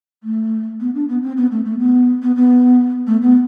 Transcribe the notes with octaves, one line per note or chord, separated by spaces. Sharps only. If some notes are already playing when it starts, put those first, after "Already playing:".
A3
B3
D4
B3
C4
B3
A3
A3
B3
B3
B3
A3
B3